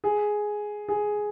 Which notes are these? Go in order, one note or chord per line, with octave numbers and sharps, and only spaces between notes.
G#4
G#4